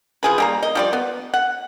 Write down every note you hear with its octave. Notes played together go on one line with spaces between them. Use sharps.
F3 G#4 B4
G3 A#3 A#5
D#5
F3 G3 D5
B3
F#5